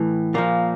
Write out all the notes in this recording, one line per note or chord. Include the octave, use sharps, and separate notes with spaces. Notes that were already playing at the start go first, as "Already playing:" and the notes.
Already playing: A2 E3
A#2 F3 A#3